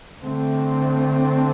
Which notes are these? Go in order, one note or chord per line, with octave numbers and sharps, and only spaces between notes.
D3 A3 C4